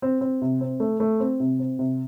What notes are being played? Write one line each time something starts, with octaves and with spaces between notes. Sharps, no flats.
C4
C4
C3
C4
A3
A3
C4
C3
C4
C3